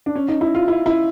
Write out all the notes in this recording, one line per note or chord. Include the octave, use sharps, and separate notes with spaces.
D4
C#4
D#4
E4
F4
E4
E4